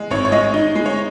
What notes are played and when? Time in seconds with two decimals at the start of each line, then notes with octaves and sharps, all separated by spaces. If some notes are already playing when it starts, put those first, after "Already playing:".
Already playing: G#3
0.10 G#1 C#5
0.25 C#5
0.32 G#3 D#5
0.54 D#4
0.75 G#3
0.86 C#5